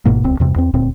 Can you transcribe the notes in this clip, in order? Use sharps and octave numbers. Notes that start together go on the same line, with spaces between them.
G#1 G#2 B2 A#3
D#1 C#2 C4
E2 G2 C3
E2 C4
D#1 D2 A#2 C4